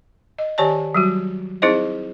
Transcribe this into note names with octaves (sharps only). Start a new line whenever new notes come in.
D#5
D#3 G4 C#5 D5 G#5 A5
F#3 G3 F#4
C4 D#4 E4 G#4 C5 D#5